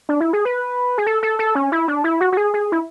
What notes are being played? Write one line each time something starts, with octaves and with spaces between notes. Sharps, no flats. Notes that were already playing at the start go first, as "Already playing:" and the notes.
D4
E4
G#4
B4
G#4
A4
A4
A4
C#4
E4
D4
E4
F#4
F#4
G#4
G#4
E4